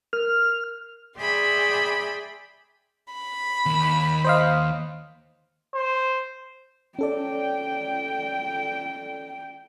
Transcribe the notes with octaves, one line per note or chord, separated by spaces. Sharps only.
A#4 F6
G#4 D5 E5 G5 B5 C6
B5
D#2
C5 D#5 F5
C5
C#4 A4 D5 G5